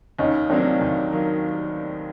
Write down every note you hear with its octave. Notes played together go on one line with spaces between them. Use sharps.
D#2 C#4 D#4
D#3 F#3 A#3 C4 D4
D#2
D#3 F#3 A#3